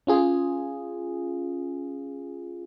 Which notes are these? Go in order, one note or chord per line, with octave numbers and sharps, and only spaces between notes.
C#4 F4 G#4